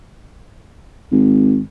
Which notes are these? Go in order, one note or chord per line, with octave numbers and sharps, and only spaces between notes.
G#1